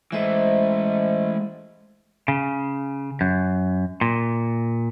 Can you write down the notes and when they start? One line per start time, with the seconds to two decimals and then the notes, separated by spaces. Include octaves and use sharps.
0.12 E3 G#3 A3 C5 D#5 E5
2.28 C#3
3.21 F#2
4.01 A#2